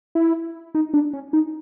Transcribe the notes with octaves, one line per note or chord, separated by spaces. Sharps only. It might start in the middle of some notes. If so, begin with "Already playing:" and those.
E4
D#4
D4
C#4
D#4